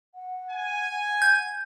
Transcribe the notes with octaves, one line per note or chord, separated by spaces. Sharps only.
F#5
G#5
G6